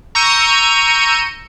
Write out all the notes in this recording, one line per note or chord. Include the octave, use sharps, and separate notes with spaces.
A#5 C#6 E6 G6 C#7 D#7